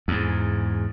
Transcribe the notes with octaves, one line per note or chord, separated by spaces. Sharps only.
E2 G#2